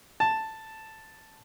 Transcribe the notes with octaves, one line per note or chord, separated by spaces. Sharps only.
A5